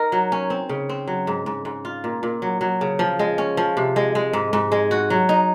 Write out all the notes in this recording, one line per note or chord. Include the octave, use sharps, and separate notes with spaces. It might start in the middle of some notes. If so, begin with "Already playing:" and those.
Already playing: D#4 A#4
F#3
C#4
C4
C#3
C4
F#3
G#2
G#2
G#2
F4
A#2
A#2
F#3
F#3
C#3
F3
G#3
C#4
F3
C3
G#3
G#3
G#2
G#2
G#3
F#4
F#3
D#4